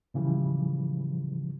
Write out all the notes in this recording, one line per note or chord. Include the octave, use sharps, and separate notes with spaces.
A2 C#3 E3 F3 G3